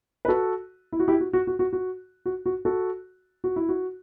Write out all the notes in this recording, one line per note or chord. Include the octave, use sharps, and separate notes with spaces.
B4
F#4 A4
E4
F#4
E4 G4
F#4
F#4
F#4
F#4
F#4
F#4
F#4
F#4 A4
F#4
E4
F#4